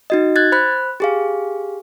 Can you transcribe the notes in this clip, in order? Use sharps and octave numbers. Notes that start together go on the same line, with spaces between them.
D#4 F#4 D#5
F#6 G#6 A6
C5 B5 F#6
G4 G#4 F5